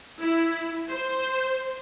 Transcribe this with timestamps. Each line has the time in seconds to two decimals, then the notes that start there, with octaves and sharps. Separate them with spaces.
0.20 E4
0.88 C5